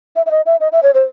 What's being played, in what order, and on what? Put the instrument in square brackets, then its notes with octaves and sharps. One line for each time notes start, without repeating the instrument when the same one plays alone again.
[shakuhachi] E5
E5
D#5
E5
D#5
E5
C#5
C5